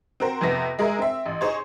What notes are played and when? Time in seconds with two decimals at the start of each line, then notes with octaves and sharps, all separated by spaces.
0.20 C4 F#4 A#4 C5
0.41 F2 C3 B3 A#6 B6
0.79 G#3 G#4 A#4 E5
0.99 C4 E5
1.26 A1
1.41 D#4 G#4 C5 C#5